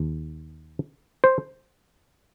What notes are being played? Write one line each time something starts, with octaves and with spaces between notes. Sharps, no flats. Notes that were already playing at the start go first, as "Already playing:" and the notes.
Already playing: D#2
C5